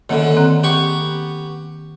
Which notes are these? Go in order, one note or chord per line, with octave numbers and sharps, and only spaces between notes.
F#2 B2 D3 D#3 A#3
C4 A#5 F#6
B3 G4 C#6